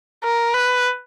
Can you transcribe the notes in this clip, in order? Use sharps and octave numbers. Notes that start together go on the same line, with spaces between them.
A#4
B4